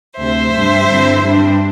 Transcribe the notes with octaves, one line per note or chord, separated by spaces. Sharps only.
D2 C3 A3 C5 E5
G2 G3 D4
G2 D3 C4 E4
G2 G3 D4